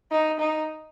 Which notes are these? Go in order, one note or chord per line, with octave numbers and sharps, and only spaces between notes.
D#4
D#4